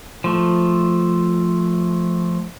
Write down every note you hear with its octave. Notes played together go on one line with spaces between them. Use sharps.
F3 A3